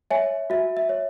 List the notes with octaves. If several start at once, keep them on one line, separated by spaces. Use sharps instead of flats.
C#5 E5 G#5
F#4 E5
E5
C#5